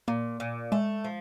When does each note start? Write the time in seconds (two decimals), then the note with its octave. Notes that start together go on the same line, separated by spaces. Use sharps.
0.08 A#2 A#3
0.40 A#2
0.72 G#3 A3
1.05 F3